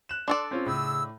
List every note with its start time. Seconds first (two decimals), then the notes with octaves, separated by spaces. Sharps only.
0.09 F#6 E7
0.28 D4 A4 D5 C6
0.51 C4 C#4 F4
0.66 A2 C#3 G#4 E6